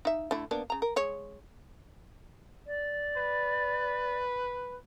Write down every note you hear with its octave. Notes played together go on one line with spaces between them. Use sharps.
D#4 E5
D3 A3 E4
A#3 B3 D4
C#3 A#5
A#4
G#3 C#5
D5
B4